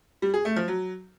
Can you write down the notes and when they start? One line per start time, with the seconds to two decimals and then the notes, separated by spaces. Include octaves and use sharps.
0.22 G3
0.34 G#4
0.45 A3
0.56 F3
0.68 F#3